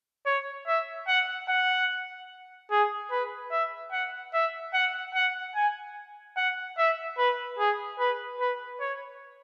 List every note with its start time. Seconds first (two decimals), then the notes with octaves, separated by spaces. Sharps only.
0.26 C#5
0.67 E5
1.08 F#5
1.49 F#5
2.71 G#4
3.11 B4
3.51 E5
3.92 F#5
4.34 E5
4.74 F#5
5.15 F#5
5.55 G#5
6.37 F#5
6.78 E5
7.18 B4
7.59 G#4
7.99 B4
8.40 B4
8.80 C#5